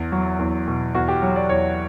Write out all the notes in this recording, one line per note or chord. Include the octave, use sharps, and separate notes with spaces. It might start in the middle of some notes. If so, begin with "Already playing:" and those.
Already playing: E2 E4
F#3
E2
B2
E2 F#4
G4
F#3 C#5
D5
E2 C#5